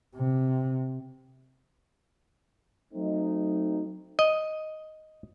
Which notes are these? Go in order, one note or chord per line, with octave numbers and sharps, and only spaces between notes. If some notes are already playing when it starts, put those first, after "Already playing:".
C3
F#3 A3 C4 D#4
D#5